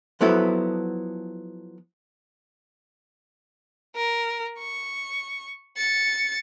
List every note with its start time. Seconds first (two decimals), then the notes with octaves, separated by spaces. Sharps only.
0.21 F3 F#3 B3 E4 A4
3.96 A#4
4.58 C#6
5.77 A6 C#7